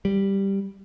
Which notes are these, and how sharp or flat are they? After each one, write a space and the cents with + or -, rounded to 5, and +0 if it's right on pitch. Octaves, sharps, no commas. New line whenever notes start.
G3 +0